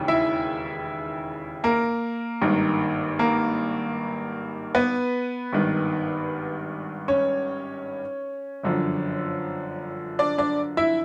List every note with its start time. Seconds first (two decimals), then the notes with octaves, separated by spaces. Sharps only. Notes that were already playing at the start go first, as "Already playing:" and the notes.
Already playing: E1 D#2 C#3 E3
0.08 E4 E5
1.64 A#3 A#4
2.42 G#1 G2 D#3
3.19 A#3 A#4
4.75 B3 B4
5.53 G#1 G2 D#3
7.08 C#4 C#5
8.63 G1 F#2 D3 F3
10.19 D4 D5
10.38 D4 D5
10.77 E4 E5